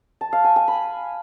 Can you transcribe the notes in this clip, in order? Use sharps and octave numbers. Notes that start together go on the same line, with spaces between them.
A5
F5
G#5
G#5
B5